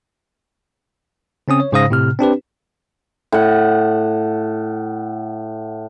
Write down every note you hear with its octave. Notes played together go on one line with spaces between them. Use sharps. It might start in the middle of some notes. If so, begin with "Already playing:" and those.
C#3 C4 C#4 D#6
C#5
G#2 C#3 C5 F5 D#6 A#6
A2 C3 F6
C4 D4 G4 B4
A2 F#5